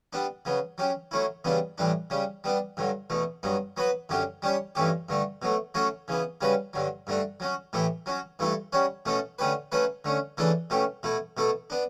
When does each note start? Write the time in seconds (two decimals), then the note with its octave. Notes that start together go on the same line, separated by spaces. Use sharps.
0.13 G3 B3 D4
0.45 C#3 F#3 B3
0.78 F#3 C#4 G4
1.11 F#3 A3 C#4 E4
1.44 E2 C#3 G3 B3 D4
1.78 A2 E3 G3 D4
2.10 C#3 G3 C#4
2.44 G3 B3 D4
2.77 G2 D3 F#3
3.10 E2 B2 A3
3.43 G2 F#3 B3
3.77 F#3 B3 F#4 B4
4.09 F#2 D3 F#3 C#4 G4
4.42 G3 C#4 G4 C#5
4.75 G2 E3 A3 C#4 G4
5.09 G2 D3 A3
5.42 B2 F#3 A3
5.74 F#3 A3 C#4 F#4 C#5
6.08 C#3 E3 B3
6.41 C#3 G3 C#4 F#4 B4
6.73 G2 D3 F#3
7.07 G2 D3 A3 D4
7.40 F#3 C#4 F#4
7.73 A2 E3 A3 E4 G4
8.06 F#3 C#4 F#4
8.39 G2 E3 A3 E4 A4
8.73 G3 C#4 F#4 C#5
9.05 B2 A3 C#4 F#4 A4
9.39 D3 A3 C#4 G4 B4
9.72 F#3 A3 C#4 F#4 B4
10.05 D3 A3 C#4
10.37 C#3 E3 A3 D4 A4
10.70 B2 A3 C#4 G4
11.03 B2 A3 E4
11.37 B2 A3 E4 A4
11.70 B3 D4